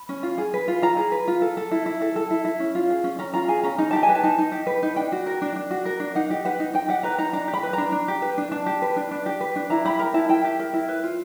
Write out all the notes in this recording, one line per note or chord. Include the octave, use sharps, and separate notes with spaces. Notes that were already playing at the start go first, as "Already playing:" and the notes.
Already playing: B5
C#4
F4
G#4
B4
F4
F4 A#5
G#4
B4
F4
A4
A4
E4
E4
A4
A4
E4
E4
C#4
F4
G#4
C#4
C#4 A#5
F4 A#5
G#4 G#5
C#4 A#5
D#4 A#5
G4 A5
G#5
B4
A5
D#4
D#4
G4
B4
D#4
D4 G5
F#4
A#4
D4
D4
F#4
A#4
D4
D#4 F#5
G4
B4 F#5
D#4
D#4 G5
G4 F#5
B4 A#5
D#4 A#5
D4 A#5
G4
B5
B4
D4 A#5
D4
G4
B4
D4
D4 A5
G4
B4
D4
D4
G4
B4
D4
E4 A#5
G4 B5
A#4 A#5
E4 A5
E4 G5
G4
A#4
E4
B4
F4